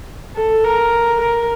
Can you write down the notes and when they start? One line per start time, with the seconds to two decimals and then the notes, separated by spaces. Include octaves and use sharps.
0.36 A4
0.64 A#4
1.20 A#4